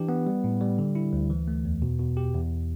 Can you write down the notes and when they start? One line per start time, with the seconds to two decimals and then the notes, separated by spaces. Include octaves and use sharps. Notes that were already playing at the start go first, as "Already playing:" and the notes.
Already playing: E3 D4 G4
0.09 B3
0.27 G3
0.44 A2
0.61 G3
0.79 D3
0.95 E4
1.13 D2
1.30 E3
1.48 A3
1.65 E2
1.82 B2
1.99 B2
2.17 G4
2.35 E2